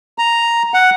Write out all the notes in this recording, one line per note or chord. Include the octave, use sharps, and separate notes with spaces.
A#5
F#5